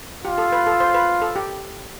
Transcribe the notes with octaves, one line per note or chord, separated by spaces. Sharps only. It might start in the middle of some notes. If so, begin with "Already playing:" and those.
F4 G4
A4
B4
A4
C5
B4
A4
G4